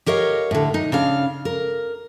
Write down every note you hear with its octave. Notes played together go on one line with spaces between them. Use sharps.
G4 A#4 C#5 D#5 F5
A2 D3
D#4
C#3 D4 F5
A#4